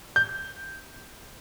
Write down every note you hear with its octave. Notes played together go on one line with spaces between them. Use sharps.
G6